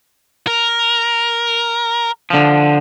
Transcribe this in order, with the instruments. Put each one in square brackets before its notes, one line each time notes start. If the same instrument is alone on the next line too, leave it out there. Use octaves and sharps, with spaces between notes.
[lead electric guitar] A#4
[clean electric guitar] D3 F3